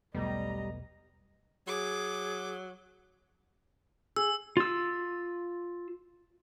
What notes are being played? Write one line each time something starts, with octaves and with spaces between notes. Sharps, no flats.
E1 B1 F#3 G3 A3 B3 D#5 A#5
F#3 G#4 D6
G#4 E6
F4 E6